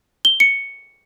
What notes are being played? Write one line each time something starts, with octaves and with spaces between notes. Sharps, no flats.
G7
C#7